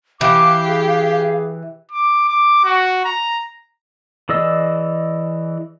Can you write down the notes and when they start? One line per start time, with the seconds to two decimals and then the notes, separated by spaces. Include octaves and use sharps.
0.21 E3 G4 F5 D6
0.67 G#4
1.91 D6
2.29 D6
2.65 F#4
3.05 A#5
4.29 E3 G#4 D5 D#5 E6